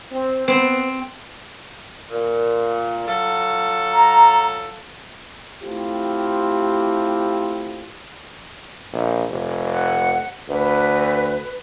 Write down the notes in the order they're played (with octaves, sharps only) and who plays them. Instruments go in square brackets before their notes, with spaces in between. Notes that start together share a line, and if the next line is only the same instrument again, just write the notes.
[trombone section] C4
[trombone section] B3 [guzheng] C4
[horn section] A#2
F#3 F4 A4
[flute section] A#5
[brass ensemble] A3 C4 E4 F4 G4
[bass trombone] A#1
F1
[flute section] F#5
[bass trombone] D2 [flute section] B4